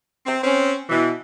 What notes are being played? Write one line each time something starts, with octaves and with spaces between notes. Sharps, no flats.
C4
C4 C#4
B2 E3